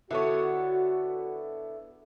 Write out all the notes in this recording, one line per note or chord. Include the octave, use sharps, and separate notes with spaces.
D3 B3 E4 F#4 A4 C#5